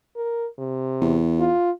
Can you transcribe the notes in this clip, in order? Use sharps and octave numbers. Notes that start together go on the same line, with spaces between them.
A#4
C3
E2
F4